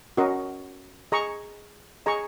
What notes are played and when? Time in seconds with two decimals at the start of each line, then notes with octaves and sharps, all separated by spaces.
0.17 C#4 F#4 A#4 D#5
1.12 G#4 D#5 A#5 C#6
2.06 G#4 D#5 A#5 C#6